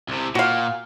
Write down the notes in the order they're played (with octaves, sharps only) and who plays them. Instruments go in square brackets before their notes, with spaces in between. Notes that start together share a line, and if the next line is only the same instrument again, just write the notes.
[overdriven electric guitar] C2 C3
[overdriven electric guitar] A#2 [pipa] F#4 F5